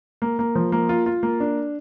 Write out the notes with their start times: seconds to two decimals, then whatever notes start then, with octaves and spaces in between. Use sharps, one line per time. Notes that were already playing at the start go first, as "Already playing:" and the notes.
0.22 A#3
0.39 A#3
0.55 F3
0.72 A#3
0.89 F4
1.06 F4
1.23 A#3
1.40 D4